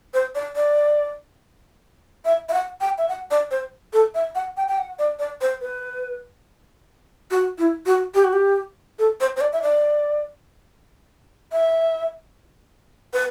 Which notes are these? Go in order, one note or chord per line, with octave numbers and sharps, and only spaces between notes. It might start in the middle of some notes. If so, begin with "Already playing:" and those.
C5
D5
D5
E5
E5
F#5
G5
E5
F#5
D5
C5
A4
E5
F#5
G5
G5
F#5
D5
D5
C5
B4
F#4
E4
F#4
G4
F#4
G4
A4
C5
C5
D5
E5
D5
E5
B4